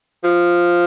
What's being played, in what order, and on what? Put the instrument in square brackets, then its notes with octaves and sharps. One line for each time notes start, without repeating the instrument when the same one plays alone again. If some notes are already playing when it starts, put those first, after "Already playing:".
[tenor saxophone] F3